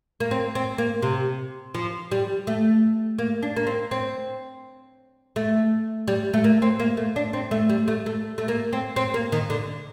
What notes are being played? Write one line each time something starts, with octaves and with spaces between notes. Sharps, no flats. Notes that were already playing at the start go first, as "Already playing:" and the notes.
A#3
C4
C4
A#3
C3
F3
G3
A3
A#3
D4
A#3
C4
C4
A3
G3
A3
A#3
C4
A#3
A3
D4
C4
A3
G3
A3
A3
A3
A#3
C4
C4
A#3
D#3
D3